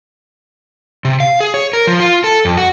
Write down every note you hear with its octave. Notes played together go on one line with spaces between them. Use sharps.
C3
F5
G#4
C#5
A#4
F3
F4
A4
F2
F#4